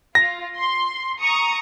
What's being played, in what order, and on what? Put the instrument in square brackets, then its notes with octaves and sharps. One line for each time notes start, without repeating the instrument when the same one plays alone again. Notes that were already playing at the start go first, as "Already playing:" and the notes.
[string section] F4 [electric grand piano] A#6
[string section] C6
A#5 C#6 D#6